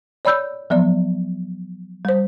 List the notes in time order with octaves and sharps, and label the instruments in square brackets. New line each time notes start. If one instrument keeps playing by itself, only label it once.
[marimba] C#5 D5 B5 E6 G6
F3 F#3 B3 D5
G3 C5